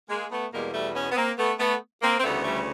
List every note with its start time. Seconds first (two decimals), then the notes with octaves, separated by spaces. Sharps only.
0.09 G#3 A#3
0.30 A3 B3
0.52 E2 B2 G3 G#3 A#3
0.73 G3 A3
0.95 B3 C#4
1.11 B3
1.16 A#3 C4
1.37 A3 B3
1.59 A3 B3
2.01 A#3 C4
2.18 C4
2.23 D2 C#3 E3 G3 A3 B3
2.44 G3 A3